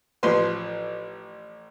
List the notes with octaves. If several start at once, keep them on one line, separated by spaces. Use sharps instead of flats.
A1 F3 B4 C6